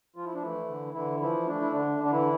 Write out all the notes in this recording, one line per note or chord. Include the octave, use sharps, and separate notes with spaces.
F3 F4
E4
D4
E3 A3 E4
D3
D3 E3 E4
E3 F3 E4
A3 D4
E4
D3 D4
D3
D4
E3 E4